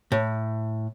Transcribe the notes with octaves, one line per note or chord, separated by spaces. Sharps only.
A2